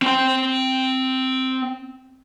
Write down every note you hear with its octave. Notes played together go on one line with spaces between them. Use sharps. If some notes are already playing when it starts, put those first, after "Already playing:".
C4 G5